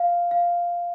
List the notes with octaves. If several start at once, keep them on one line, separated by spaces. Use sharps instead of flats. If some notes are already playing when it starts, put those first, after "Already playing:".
Already playing: F5
F5